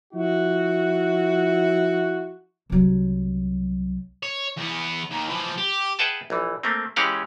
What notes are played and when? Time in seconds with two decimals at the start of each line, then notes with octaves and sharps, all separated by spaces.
0.14 F3 E4 F#4
2.70 C2 F#3
4.23 C#5
4.57 E2 B3
5.11 D#2 D#3
5.29 E3 F3
5.58 G4
5.99 G#4 B4 E5 F#5 G5 A5
6.30 A#1 E3
6.63 A3 A#3 C4
6.96 E3 G#3 C#4 G4 F5 F#5